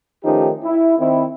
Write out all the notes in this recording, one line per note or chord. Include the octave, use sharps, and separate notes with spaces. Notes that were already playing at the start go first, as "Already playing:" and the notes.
D#3 F3 A3 C#4 D#4 G4
E4
D#3 C4 E4